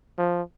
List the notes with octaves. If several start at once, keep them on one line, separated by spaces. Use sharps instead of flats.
F3